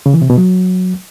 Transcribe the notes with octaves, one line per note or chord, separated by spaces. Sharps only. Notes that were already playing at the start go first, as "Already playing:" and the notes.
C#3
E3
C3
B2
F#3